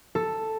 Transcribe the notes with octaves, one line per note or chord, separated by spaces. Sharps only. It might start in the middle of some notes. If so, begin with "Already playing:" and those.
A4